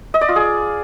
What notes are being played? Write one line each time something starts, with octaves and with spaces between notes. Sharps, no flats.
D#5
D5
F4
G#4